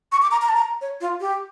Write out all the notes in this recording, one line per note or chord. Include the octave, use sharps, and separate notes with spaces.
C#6
D6
A#5
A#5
A5
A#5
C#5
F4
G4